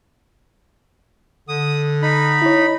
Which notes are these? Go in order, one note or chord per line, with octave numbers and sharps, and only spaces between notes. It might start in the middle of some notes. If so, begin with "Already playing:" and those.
D3 D#6
D#4 B5
E4 C#5